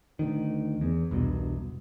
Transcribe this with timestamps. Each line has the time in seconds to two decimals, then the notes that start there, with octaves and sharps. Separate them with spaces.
0.19 D2 D#3
0.81 E2
1.11 E1 C2 G2 B2